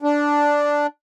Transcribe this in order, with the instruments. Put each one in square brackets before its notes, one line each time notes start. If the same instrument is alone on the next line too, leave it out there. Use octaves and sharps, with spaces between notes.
[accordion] D4